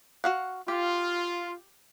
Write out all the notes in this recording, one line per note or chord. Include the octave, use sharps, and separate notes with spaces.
F#4 F5 F#5
F4 G4